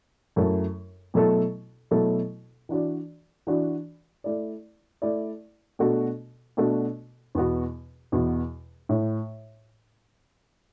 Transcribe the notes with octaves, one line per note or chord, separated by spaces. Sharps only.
F#2 F#3 A3 E4 A4
B2 F#3 A3 E4 A4
B2 F#3 A3 E4 A4
E3 D4 F#4 D5
E3 D4 F#4 D5
A3 E4 D5
A3 E4 D5
B2 A3 D4 F#4 A4
B2 A3 D4 F#4 A4
E2 B2 B3 F#4
E2 B2 B3 F#4
A2